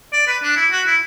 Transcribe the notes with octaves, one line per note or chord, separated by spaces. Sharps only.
D5
B4
D4
E4
F#4
E4